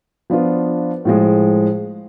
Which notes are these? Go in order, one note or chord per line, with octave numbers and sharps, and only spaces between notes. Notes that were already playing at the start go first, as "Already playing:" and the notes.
F3 B3 D4 F4
A2 F3 G#3